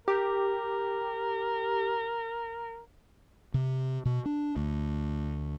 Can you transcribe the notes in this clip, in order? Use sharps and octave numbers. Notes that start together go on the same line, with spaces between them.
G4 A#4
C3
B2
D4
D2